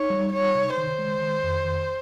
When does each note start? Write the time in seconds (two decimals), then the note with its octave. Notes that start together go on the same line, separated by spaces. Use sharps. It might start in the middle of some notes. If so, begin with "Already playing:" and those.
Already playing: D#4 C#5
0.10 G3
0.33 D#4 C#5
0.55 C3
0.77 D#3 C5
0.99 G#3
1.21 D#3
1.43 F2
1.65 D#3